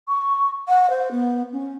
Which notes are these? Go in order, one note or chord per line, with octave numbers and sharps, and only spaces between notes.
C#6
F#5
C5
B3
C#4